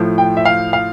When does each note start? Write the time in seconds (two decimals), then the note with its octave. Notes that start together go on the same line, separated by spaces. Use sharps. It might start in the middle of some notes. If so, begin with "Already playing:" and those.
Already playing: A2 F3 A3
0.18 G5
0.37 E5
0.45 F5
0.73 F5